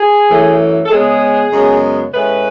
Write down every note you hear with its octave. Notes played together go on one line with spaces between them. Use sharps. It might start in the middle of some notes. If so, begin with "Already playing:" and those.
Already playing: G#4
F#2 E3 A3
A4
C#3 G#3 B3 G#4
F#2 C#3 G#3 B3
A2 G#3 C#4 B4